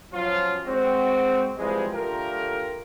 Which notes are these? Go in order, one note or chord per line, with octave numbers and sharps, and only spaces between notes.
F3 F#3 C#4 F4
G#3 C4 F#4
C3 E3 F3 G3 G#3
D3 A3 F4 G4 A#4